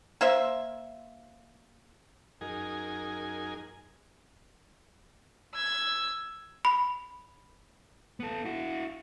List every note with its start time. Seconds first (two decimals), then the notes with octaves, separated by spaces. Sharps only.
0.21 A#3 C5 E5
2.41 F#2 D#4 G#4 A#4 G#5
5.55 E6 G#6
6.65 B5
8.20 B3 A4
8.45 E4 F#4